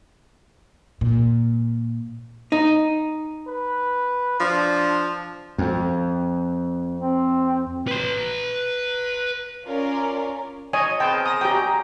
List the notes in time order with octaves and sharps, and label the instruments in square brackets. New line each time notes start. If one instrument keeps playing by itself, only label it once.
[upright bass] A#2
[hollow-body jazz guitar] D#4
[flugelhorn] B4
[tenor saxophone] F3 [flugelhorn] D4
[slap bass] F2
[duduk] C4
[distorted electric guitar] B4 C6
[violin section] C#4 F4 A#4 D5
[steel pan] C#5 D#5 G#5
[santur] B3 C4 G#4 [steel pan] G5 A5
[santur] A#4
[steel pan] D#6
[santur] F#3 D#5 A#5 [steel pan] G4 G5
[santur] F#3